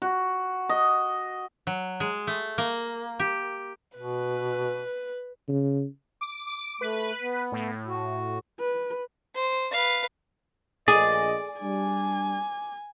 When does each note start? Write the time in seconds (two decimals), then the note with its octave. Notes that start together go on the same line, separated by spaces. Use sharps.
0.02 F#4
0.69 D#5
1.67 F#3
2.00 G#3
2.27 A3
2.58 A#3
3.20 G4
3.97 B2 B4
5.48 C#3
6.21 D6
6.81 A3 B4
7.22 B3
7.52 A2
7.87 F#4
8.59 B4
9.35 C5
9.71 B4 F5
10.88 A#1 G#4 D5 D#5
11.62 G3 D4 G#5